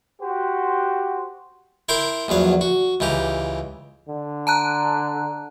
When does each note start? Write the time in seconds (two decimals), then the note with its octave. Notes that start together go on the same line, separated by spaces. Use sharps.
0.21 F#4 G4 C5
1.89 E4 A#4 G5 C6 D6
2.28 A#1 E2 F#3 F5
2.61 F#4
3.00 C#2 E3 G4 A#5
4.09 D3
4.47 A5 A#5 F#6